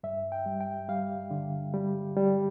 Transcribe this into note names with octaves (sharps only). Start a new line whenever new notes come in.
G2 E5
G5
G3
G5
G3 F5
D3
G3
G3